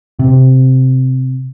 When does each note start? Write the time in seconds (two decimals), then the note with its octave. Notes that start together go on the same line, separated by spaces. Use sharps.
0.19 C3